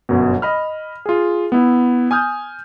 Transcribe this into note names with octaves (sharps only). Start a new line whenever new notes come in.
G1 F#2 B2
D#5 B5 F6
F4 G#4
B3 E4
G#5 D#6 F6 G6